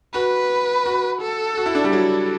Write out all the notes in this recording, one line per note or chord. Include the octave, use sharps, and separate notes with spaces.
F#4 B4
F#4
A4
F#4
E4
D4
G3
F#3 A4